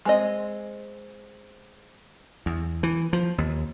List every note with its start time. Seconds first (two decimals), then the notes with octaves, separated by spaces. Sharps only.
0.05 G#3 C4 D#5
2.46 E2
2.83 E3
3.13 F3
3.38 D#2